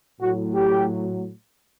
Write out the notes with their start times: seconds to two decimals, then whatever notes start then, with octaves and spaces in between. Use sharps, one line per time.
0.21 A2 F#3 F#4
0.55 G4